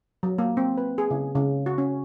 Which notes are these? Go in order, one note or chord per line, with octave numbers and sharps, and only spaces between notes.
F#3
A#3
C4
B4
G#4
C#3
C#3
F#4
C#4